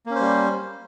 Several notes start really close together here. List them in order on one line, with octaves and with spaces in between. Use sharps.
A#3 C#4 C5 G3